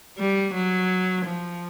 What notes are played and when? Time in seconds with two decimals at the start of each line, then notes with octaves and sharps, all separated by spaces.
0.18 G3
0.53 F#3
1.25 F3